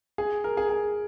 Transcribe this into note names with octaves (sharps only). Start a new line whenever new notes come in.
G#4
A#4
G#4
G#4